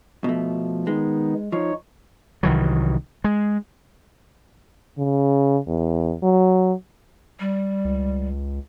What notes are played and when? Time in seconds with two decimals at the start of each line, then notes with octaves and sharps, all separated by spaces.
0.24 B2 F3 A3
0.87 D#3 G#3 B3 D#4
1.52 F3 D#4 C#5
2.43 C2 D#3 E3 F#3
3.24 G#3
4.98 C#3
5.67 E2
6.23 F#3
7.40 G3
7.85 C#2